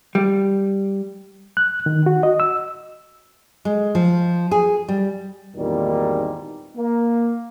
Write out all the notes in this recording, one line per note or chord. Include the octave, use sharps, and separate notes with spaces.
G3
F#6
D#3
F#4
D#5
E6
G#3
F3
G#4
G3
G#1 E2 A#2 D#3 G3
A#3